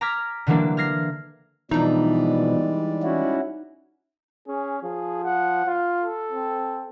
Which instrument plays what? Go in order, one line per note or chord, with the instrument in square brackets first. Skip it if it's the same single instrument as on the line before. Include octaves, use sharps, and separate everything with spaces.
[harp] A#5 D6 F6 G#6 B6
D3 E3 F#3 G3 A#3 D4
F6 G#6 A#6 C7
[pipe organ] B2 F3 [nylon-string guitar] E3 D4 [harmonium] G3 G#3 D5 [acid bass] D#4
[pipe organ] C#4 E4 F#4
[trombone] C#4 [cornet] G#4
[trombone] F3 [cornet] G#4
[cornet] F#5
[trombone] F4
[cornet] A4
[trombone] C4